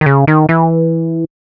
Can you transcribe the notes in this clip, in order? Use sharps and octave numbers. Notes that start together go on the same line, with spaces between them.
D#3
C#3
D#3
E3